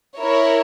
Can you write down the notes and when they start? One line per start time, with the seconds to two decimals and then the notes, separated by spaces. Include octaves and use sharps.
0.18 E4 A#4 C#5